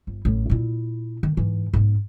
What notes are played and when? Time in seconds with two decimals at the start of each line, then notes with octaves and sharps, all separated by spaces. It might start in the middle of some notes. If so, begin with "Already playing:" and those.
0.07 G1
0.25 A1 A2
0.50 A#2 E4
1.23 D#3
1.37 G#2 E3
1.74 G#2 B3